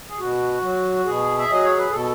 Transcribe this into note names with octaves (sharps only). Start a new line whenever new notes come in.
G#4
B2 F#4
F#3
B2 G#4
E5
F#3 D#5
C#5
B4
B2 A4